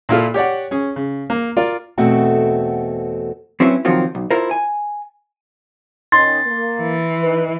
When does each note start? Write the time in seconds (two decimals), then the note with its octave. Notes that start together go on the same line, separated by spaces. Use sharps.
0.09 A#2 E4 F4 A4
0.34 G4 C#5 D5 F#5
0.71 C#4 G#4
0.96 C#3
1.30 A#3
1.57 F4 A#4 D5
1.98 E2 B2 A3 C4 F#4 A4
3.60 F#3 C4 C#4 E4 B4 E5
3.85 C2 D#3 F3 F#3 C4 F4
4.15 B1
4.31 E4 F4 A#4 C5
4.51 G#5
6.12 D#3 C#4 D#4 C6 A6
6.46 A#3
6.81 E3
7.23 D#4 B4